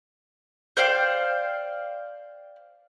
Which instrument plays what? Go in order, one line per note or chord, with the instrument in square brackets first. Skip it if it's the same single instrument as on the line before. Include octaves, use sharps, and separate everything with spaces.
[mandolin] C5 D5 F5 G5